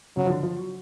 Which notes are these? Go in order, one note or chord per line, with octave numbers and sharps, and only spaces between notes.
C#3 F#3
F3
D3
F3
F#3